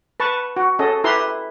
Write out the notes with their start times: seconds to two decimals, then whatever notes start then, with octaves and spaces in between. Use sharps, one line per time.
0.20 B4 A5 C#6
0.56 F#4
0.79 C#4 G#4 A4 D#5
1.04 E4 G4 B4 E5 A#5 C6